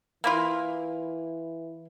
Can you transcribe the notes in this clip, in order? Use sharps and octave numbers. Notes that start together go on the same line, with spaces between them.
E3 A#3 E4 F4